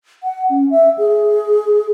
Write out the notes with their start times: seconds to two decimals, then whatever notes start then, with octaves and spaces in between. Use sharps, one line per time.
0.23 F#5
0.50 C#4
0.70 E5
0.98 G#4